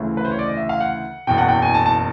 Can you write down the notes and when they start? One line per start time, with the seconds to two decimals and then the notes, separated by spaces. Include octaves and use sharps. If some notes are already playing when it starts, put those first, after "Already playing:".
Already playing: D2 C#3 E3
0.17 B4
0.25 C5
0.31 C#5
0.39 D5
0.46 D#5
0.57 E5
0.69 F5
0.81 F#5
1.27 F#1 E2 B2 G5
1.38 F#5
1.49 G5
1.62 G#5
1.74 A5
1.86 A5